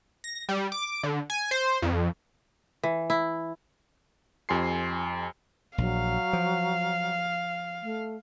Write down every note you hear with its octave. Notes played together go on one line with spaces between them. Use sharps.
A#6
G3
D6
D3
G#5
C5
F2
E3
E4
F2 G4 G#5 C6 C7
A#1 F#3 F5
F3
A3